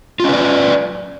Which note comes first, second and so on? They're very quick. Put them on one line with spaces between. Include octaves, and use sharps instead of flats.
F4 C#4 B4 D5